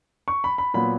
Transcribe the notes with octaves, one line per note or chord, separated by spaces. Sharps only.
C#6
B5
B5
A#2 F#3 B3 B5